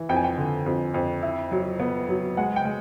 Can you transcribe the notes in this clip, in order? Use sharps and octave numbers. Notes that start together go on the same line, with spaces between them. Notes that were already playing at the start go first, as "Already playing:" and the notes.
Already playing: E3
F2 G5
G#5
G5
D3
F2
F2
E4
F#3
B3
F#3
G#3 F#5
G5
G#3